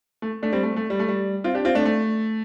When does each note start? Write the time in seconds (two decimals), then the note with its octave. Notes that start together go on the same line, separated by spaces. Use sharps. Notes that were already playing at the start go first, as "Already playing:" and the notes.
0.22 A3
0.43 A3 D4
0.53 G3 C4
0.63 A3
0.76 A3
0.90 G3
1.00 A3
1.08 G3
1.44 C4 F4
1.55 D4 G4
1.65 C4 F4
1.75 A3 D4
1.85 A3